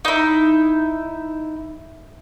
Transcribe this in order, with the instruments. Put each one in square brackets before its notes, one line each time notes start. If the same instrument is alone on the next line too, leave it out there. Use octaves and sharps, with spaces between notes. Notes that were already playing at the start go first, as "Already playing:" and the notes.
[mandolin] D#4 E4